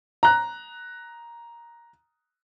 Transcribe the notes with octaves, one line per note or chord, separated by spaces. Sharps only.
A#5 F#6